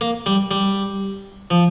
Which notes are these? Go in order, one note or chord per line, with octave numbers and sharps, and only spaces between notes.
A#3
G3
G3
F3